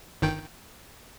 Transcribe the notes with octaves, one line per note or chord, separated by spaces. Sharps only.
G1 D#3 G5